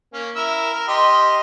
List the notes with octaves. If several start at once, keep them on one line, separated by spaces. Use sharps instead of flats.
A#3 C#4
E4 A#4 E6
A#4
G4 D#5 C6